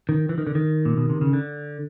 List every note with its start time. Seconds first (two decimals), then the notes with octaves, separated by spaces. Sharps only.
0.09 D#3
0.29 E3
0.38 D#3
0.47 D3
0.55 D#3
0.85 A#2
0.97 B2
1.10 C3
1.21 C#3
1.33 D3